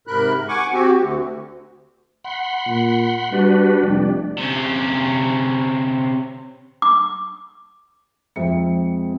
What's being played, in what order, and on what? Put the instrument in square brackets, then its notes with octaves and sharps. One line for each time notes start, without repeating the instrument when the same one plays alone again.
[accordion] G#2 C3 A#4 B5 F#6
F#5 G#5 C#6 D6
C4 F#4 G4
D2
[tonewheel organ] F#5 B5 C6
[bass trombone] A#2
[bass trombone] G3 [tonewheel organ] D4 F#4 B4
[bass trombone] F1 [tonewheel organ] G3 D4
[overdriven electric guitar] C3 C#4
[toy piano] D6
[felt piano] F2 E5 C#7 [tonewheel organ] G#3 C4